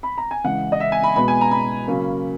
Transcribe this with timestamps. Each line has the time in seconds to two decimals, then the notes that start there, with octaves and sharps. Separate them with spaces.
0.03 B5
0.18 A#5
0.31 G#5
0.44 C#3 E3 G#3 F#5
0.72 D#5
0.80 E5
0.92 G#5
1.03 B5
1.16 B2 G#3 B3 B5
1.28 G#5
1.41 A#5
1.51 B5
1.88 C#3 F#3 A#3 C#4